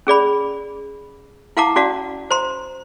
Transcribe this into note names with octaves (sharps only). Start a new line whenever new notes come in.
C#4 G#4 D5 B5
E4 F5 F#5 A5 A#5 D6
C#4 F#4 D5 F5 A5
C5 A#5 C6